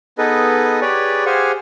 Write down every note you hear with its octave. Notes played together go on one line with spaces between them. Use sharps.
B3 D#4 G#4 A4 B4 D#5
G4 G#4 B4 C#5 D5
G4 G#4 C5 F5 F#5 G#5